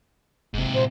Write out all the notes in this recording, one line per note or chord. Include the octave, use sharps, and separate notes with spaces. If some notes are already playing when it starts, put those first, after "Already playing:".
F1 G#2 C3
A#2 C5